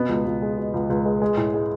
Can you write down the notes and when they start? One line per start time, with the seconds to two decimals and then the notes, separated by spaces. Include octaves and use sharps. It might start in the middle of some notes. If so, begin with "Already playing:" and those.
Already playing: B2 B3
0.09 C#2
0.26 C#2
0.42 G#3
0.58 B2
0.74 C#2
0.90 C#2
1.05 G#3
1.22 G#3
1.37 A2
1.54 G#3